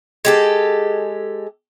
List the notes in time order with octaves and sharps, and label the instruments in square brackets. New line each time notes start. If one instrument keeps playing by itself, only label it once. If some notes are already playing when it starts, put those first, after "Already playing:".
[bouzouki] G#3 G4 A4